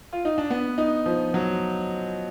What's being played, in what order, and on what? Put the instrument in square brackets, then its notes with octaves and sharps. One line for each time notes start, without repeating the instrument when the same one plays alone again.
[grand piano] F4
D#4
D4
B3
D#4
F3
F#3